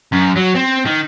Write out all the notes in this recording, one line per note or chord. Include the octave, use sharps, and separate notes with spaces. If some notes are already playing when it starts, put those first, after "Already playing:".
F#2
F#3
C4
D#3